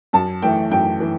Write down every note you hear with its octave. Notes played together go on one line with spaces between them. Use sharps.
F#2 A5
E3 A3 G5
F#2 G5
E3